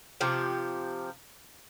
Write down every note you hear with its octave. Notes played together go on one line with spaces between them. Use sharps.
C3 F3 G4